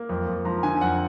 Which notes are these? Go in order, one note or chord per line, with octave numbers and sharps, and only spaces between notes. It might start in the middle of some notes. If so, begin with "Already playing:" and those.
Already playing: A#3
F2
F2
F3 A#5
D3 G#5
F2 F#5